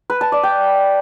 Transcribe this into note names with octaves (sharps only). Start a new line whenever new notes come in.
B4
A5
D5
G5